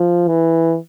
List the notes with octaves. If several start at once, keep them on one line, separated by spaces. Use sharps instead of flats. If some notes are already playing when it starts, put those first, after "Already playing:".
Already playing: F3
E3